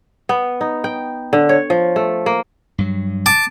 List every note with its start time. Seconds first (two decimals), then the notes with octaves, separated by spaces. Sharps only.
0.29 B3
0.61 D#4
0.84 G5
1.33 D3
1.49 C#5
1.70 F3
1.96 A3
2.26 A#3
2.78 G2 F#3
3.26 A5 D6